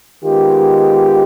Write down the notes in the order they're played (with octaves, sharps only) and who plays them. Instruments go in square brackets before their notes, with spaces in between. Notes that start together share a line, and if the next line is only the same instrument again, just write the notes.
[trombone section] D#3 G#3 B3 F4 G4